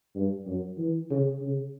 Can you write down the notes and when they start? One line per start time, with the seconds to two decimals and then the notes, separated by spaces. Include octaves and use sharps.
0.15 G2
0.47 F#2
0.78 E3
1.11 C#3
1.41 C#3